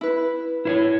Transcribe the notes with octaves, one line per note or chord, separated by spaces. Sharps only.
E4 B4
E4 C5 C#5